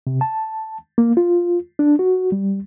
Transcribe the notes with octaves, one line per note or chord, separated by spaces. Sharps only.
C3
A5
A#3
F4
D4
F#4
G3